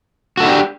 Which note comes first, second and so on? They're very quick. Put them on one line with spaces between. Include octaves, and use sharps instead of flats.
F#4 A4 E4 D4 G4